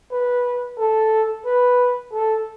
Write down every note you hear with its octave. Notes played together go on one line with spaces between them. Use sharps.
B4
A4
B4
A4